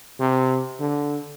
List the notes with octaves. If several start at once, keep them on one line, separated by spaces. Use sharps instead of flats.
C3
D3